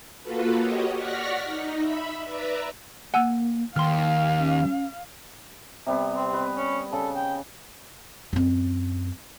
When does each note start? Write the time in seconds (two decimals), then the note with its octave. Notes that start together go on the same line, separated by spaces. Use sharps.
0.22 A#3 F4 F#4 A4 B4
0.59 F#4 G4 C#5 D#5
0.95 D5 F#5 C#6 F6 A#6 B6
1.44 D#4
1.75 E5 B5
2.25 B4 D5 E5 A#5
3.14 A#3 F#5 G#5 E6
3.76 D#2 F5 G5 C6 F6
4.40 C#4
5.87 C3 G3 B3
6.16 C4
6.33 B4 D#5
6.57 C#4
6.93 C#3 A4
7.15 G5
8.33 F#2 C4